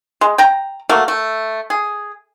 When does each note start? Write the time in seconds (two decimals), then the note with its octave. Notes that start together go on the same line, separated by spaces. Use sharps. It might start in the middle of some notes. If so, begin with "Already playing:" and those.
0.21 G#3
0.38 G5 A#5
0.89 F#3 A3 A#3
1.08 A3
1.70 G#4